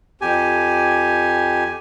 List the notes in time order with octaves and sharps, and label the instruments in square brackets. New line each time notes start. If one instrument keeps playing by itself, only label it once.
[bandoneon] F2 G4 G#5